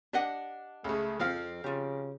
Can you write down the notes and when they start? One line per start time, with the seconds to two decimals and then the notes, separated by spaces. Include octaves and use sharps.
0.13 D4 G4 D#5 F#5
0.84 C#2 C#3 A3
1.19 F2 F3 C4 F5
1.64 C#3 F4 G4